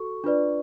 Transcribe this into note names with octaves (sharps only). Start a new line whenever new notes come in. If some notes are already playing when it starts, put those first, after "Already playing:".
Already playing: F#4 A4 C#6
D4 F4 B4 D5